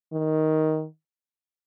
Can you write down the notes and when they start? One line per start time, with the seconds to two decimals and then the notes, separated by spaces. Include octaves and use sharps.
0.13 D#3